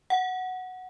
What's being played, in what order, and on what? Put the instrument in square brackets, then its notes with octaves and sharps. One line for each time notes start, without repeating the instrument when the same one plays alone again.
[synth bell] F#5